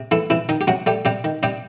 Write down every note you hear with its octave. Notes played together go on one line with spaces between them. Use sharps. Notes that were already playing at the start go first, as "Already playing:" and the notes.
Already playing: C3
E3 A3 E4
C3 E3 E4
D#3 D#4
G4
C3 F#3 F#4
G3 A3 G4
C3 G3 G4
D#3
C3 G3 G4